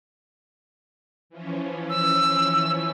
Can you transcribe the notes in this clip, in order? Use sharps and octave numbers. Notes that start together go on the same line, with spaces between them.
E3 F3 C#4
E6